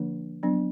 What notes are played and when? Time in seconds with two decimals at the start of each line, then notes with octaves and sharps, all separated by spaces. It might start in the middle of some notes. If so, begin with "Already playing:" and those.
Already playing: D3 F3 A#3 D4
0.43 F#3 B3 D4